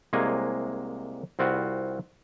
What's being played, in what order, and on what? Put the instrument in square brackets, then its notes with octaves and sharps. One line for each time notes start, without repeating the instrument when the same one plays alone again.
[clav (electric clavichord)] C2 C3 G#3 A#3 C#5 G#5
C2 C4 F4 F#4 B4